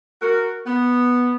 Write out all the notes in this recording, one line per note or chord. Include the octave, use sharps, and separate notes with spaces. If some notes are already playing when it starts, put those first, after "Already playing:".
F#4 A#4
B3